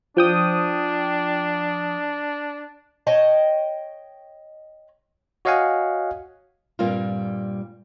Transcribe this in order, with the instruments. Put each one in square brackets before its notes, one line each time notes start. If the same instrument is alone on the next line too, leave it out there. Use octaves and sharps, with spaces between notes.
[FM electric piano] F3 G5 D#6 [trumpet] D4
[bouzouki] C#5 D#5 G5 A5
[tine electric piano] F#4 C#5 D#5 F5 F#5 G#5
[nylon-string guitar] G2 A#2 G3 A#3 C4 F4